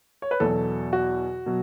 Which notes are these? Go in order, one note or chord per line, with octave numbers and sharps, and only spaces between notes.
C#5
B4
E2 B2 F#3 A4
F#4
B2 F#3